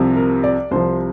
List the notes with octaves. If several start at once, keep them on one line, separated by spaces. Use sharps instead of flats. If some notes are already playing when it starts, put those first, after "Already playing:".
Already playing: C2 C3 F3
A#4
D5
C2 C3 F3 C5